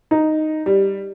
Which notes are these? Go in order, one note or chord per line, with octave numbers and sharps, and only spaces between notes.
D#4
G3